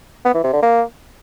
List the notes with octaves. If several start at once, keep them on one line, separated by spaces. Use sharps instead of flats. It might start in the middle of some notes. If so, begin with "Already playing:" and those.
B3
E3
C3
D3
A#3